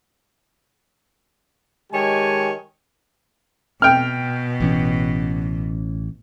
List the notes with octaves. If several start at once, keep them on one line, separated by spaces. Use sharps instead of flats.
D#3 G#3 G4 C#5 G#5 A5
B2 G5 F6
A1 E3 C#4